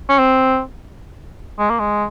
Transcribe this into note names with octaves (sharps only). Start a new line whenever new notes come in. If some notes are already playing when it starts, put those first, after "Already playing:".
C#4
C4
G#3
A#3
G#3